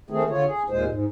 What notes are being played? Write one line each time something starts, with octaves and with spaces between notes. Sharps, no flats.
D#3 A3 C4 G#4
D3 F4 C#5
G#4
D#2 A#2 G#3 C5
G#2